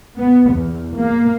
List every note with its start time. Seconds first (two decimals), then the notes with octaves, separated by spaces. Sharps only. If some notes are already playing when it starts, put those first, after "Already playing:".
0.18 B3
0.53 E2
0.97 A#3